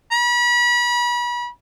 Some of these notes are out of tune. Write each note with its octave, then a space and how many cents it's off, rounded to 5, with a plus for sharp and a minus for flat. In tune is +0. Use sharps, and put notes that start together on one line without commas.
B5 -35